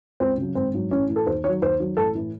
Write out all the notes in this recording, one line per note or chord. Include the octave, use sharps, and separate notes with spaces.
C#2 C4
C#3 F#3
G#1 C4
G#2 F#3
A1 C#4
A2 E3
A4
D#2 C5
D#3 F#3 C#5
D#2 C5
D#3 F#3
A1 A4
A2 E3